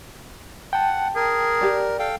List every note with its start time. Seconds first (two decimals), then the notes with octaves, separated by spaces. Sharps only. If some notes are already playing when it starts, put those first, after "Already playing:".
0.73 F#5 G5 A5
1.16 G#4 A#4
1.61 G4 D5
1.99 A4 F5 G5